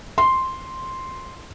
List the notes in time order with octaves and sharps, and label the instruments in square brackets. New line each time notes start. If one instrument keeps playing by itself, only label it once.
[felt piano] C6